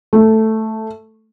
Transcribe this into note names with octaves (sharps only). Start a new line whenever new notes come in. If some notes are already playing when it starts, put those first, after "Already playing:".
A3